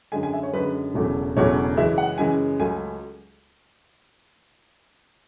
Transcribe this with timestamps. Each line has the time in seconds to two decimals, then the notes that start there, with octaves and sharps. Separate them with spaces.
0.12 F#2 D3 G#3 G#5
0.23 G#5
0.33 E5
0.43 C#5
0.54 F#2 D3 G#3 B4
0.94 E1 E2 C#3 F#3 A3
1.36 E1 E2 C#3 F#3 A3 C#5
1.77 F#2 C#3 E3 G#3 E5
1.98 F#5
2.18 F#2 C#3 E3 G#3 G#5
2.59 C#2 C#3 F#3 A3 G#5